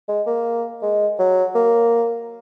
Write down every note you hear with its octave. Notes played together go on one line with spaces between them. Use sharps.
G#3
A#3
G#3
F#3
A#3